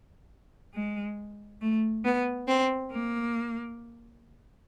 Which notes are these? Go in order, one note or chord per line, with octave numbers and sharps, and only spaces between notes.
G#3
A3
B3
C4
A#3